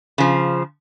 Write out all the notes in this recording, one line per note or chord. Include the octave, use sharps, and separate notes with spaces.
C#3 F3